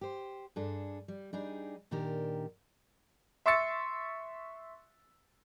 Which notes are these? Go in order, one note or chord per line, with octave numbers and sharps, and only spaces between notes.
G4 C5
G2 D4 G#4 A4
G3
G3 D4 D#4 G#4
A#2 D#3 D4 G4 A#4
E5 C6 C#6 E6 A6 C#7